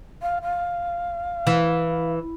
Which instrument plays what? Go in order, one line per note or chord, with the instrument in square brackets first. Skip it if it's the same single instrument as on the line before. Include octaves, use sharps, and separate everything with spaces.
[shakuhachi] F5
F5
[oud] E3